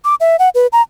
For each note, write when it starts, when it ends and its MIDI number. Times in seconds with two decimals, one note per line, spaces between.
0.05 0.15 86
0.20 0.36 76
0.39 0.49 78
0.55 0.67 71
0.73 0.82 82